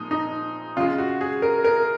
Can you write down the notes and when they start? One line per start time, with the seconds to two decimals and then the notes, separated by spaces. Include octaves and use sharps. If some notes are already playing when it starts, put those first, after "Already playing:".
Already playing: A#2 F3 G#3 D#4
0.11 D#4
0.76 C#3 F4
0.80 G#3
0.98 F#4
1.21 G#4
1.42 A#4
1.64 A#4